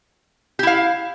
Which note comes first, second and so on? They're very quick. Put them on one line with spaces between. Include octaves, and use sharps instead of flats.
G4 E4 F5